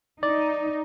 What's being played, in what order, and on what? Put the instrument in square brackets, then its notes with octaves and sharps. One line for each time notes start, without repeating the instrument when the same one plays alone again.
[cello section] D#4 [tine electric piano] D5